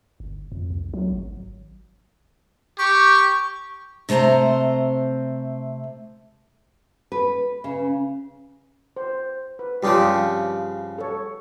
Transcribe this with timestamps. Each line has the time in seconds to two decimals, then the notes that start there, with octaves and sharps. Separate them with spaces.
0.20 G1
0.52 F2
0.70 C2
0.94 F#3
1.12 G#1
2.79 G4 C#6
4.09 C3 A3 C5 G#5 A#5
7.12 B4
7.64 C#3
8.97 C5
9.59 B4
9.83 G2 C#3 F3 G4 D5
10.98 A4 C#5